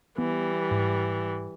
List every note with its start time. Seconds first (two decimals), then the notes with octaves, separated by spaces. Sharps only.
0.18 E3 G3 B3
0.71 G#2